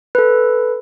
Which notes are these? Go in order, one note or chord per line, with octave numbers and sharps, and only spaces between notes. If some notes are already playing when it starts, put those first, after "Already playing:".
A4 B4